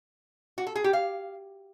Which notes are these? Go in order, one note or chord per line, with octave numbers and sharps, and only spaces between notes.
F#4
A4
G#4
G4
F5